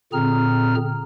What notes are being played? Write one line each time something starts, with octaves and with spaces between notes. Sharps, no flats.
A#2 D3 C4 G#4 A#5 F6